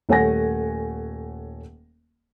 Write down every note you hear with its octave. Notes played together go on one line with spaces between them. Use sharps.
D#1 A3 C#5 F#5 G#5 A#6